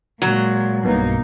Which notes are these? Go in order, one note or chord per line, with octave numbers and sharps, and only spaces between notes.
A#2 F#3 G#3
B1 G2 B2 A#3 D#4